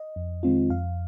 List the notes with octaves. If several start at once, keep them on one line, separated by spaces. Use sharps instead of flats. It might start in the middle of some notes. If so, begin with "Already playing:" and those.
Already playing: D#5
F2
D#3 G#3 C4 F4
F2 F5